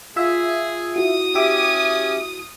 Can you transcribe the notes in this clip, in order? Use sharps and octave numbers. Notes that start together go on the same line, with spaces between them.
F4 G#4 E5
E4 F#4 D#6 D#7
C#4 G4 E5 D6